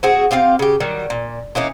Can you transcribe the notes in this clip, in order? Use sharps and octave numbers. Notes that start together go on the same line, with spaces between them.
C4 F#4 G#4
C4 F4 G4 F5
C#3 G4
D#3 F#3 G3
A#2
E3 A#3 C#4 D#4